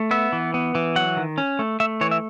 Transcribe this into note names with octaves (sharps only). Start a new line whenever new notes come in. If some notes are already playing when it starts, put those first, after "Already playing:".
Already playing: A3
B3 E5
E3
B3
E3
F#3 F#5
D#3
C#4
A3
A3 E5
E3 C#5
E5